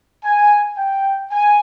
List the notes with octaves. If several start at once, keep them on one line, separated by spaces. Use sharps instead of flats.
G#5
G5
G#5